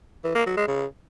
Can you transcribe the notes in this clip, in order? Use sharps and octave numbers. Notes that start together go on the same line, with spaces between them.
E3
A#3
F#3
G#3
C#3